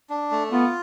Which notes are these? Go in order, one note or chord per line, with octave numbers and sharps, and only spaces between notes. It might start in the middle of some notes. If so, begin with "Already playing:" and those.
D4
A3
B3 F4